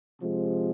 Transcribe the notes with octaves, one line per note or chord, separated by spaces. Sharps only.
C3 F3 G#3